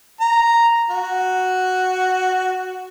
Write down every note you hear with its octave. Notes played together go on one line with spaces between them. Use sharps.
A#5
F#4